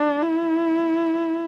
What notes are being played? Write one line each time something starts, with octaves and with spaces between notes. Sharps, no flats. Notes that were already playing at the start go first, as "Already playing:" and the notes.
Already playing: D4
E4